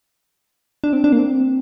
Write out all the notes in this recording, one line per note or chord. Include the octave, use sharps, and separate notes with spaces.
D4
C4
D4
A#3
C4